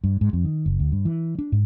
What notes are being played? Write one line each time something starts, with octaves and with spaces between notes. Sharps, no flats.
G2
G#2
F2
D#3
F#1
D2
G2
E3
D4
G#2